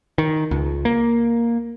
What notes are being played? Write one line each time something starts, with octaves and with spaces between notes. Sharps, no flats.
D#3
C#2
A#3